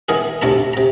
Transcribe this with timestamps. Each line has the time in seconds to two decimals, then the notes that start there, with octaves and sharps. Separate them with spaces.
0.09 D#3 B3 E4 G#4 A#4
0.42 D2 C3 C#4 E4 A5 A#5
0.73 C3 A#5